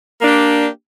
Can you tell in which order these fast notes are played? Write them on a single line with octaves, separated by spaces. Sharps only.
A#3 D4 G4